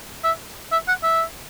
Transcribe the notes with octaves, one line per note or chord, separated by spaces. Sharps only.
E5
E5
F#5
E5